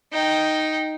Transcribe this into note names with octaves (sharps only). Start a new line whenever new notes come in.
D#4 G5